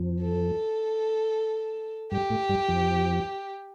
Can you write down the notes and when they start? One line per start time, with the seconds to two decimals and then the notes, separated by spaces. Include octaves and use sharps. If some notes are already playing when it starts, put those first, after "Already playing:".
Already playing: F2 F3
0.22 A4
2.12 G2 G3 G4
2.30 A2 A3
2.49 G2 G3
2.68 F2 F3